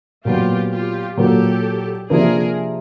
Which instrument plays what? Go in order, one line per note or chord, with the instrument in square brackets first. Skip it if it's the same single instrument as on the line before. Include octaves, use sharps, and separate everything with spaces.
[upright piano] A#2 F#3 B3 [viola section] F4 G4
[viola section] F4 G4
[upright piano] A#2 F#3 A#3 [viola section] G4 A4
[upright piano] C3 F3 A#3 D4 [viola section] G#4 A#4